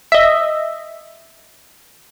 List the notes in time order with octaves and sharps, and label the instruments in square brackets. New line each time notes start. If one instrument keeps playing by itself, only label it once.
[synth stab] D#5 E5